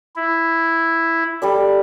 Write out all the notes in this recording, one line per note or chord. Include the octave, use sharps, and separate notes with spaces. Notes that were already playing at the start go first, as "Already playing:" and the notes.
E4
G3 A4 D5